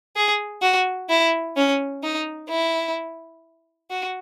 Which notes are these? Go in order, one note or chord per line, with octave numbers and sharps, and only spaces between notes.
G#4
F#4
E4
C#4
D#4
E4
F#4